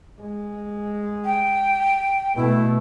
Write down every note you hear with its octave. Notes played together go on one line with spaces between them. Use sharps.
G#3
G5
B2 A3 E4